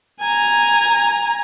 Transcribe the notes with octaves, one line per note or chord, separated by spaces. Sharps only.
G#5 A#5